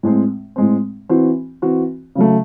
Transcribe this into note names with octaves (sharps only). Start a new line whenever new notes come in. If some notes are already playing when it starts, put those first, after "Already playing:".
A2 G#3 C4
A2 G#3 C4
E3 C4 F#4
E3 C4 F#4
C#3 F#3 A3